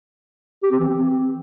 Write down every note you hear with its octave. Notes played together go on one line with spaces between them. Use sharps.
G4
C4
E3
C4